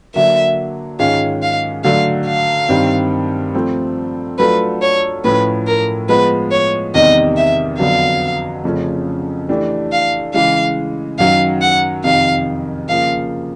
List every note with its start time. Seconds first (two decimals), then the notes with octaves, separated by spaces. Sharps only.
0.14 D3 F#3 A#3 E5
0.99 G#2 D#3 G#3 C#4 F4 F5
1.42 F5
1.84 D3 F#3 A3 F5
2.26 F5
2.69 G2 D#3 G3 C4
3.55 F3 A3 C4
4.39 F#3 A3 D4 F4 A4 B4
4.82 C#5
5.24 A2 F3 A3 C#4 E4 B4
5.67 A#4
6.09 F3 G#3 B3 B4
6.51 C#5
6.94 E2 C3 D#3 G3 D#5
7.37 E5
7.78 F2 D3 F#3 B3 F5
8.64 F2 C#3 F3 A3 C#4
9.49 E3 A3 D4 G4
9.92 F5
10.34 C#3 E3 G#3 F5
11.19 F#2 D#3 F#3 F5
11.61 F#5
12.04 F2 C3 D#3 F5
12.88 C#3 F3 A#3 F5